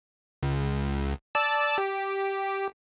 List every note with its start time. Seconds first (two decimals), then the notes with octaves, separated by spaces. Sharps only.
0.43 C#2
1.35 D5 A5 E6
1.78 G4